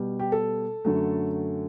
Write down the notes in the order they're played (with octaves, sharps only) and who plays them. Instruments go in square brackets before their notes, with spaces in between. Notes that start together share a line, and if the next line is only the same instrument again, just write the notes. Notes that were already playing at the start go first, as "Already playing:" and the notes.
Already playing: [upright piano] B2 G3
G4
A4
F#2 D3 F#3 A3